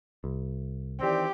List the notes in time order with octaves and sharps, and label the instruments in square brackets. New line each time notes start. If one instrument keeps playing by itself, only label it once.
[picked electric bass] C2
[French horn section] D#3 E3 D5 [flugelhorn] C4 [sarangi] G4